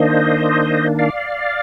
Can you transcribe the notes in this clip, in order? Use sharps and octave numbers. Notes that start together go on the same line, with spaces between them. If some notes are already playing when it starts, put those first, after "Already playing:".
Already playing: D#3 A#3 D4 C5 D#5
D5 F5